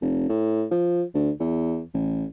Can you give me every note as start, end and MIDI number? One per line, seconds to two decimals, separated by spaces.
0.01 0.25 29
0.29 0.64 45
0.71 1.03 53
1.14 1.30 38
1.40 1.82 40
1.94 2.25 33